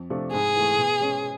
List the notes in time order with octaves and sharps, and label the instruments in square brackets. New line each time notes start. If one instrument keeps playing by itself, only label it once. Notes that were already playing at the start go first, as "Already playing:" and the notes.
Already playing: [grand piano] F2
C3 F3 A3 D4
[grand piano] G#2 [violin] G#4
[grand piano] E3 A3
B2
G#3 C#4